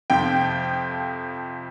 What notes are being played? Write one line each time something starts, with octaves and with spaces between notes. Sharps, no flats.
F2 C3 F3 C4 G5